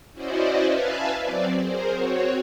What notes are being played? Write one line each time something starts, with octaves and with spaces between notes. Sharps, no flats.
C#4 E4 F#4 C5 D5 D#5
B4 E5 F5 G#5 A5
F#3 C4 D5
G#4 A#4 C5
C4 F#4 C#5